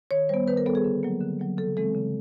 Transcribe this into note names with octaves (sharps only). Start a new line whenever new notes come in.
D#3 C#5
G3 B3 C5
D#3 B4
A#4
G3 B3 A4
G#4
D3
F#3 A#3
D3
F#3 A#3
C#3 A4
E3 G#3 C4 A4
C#3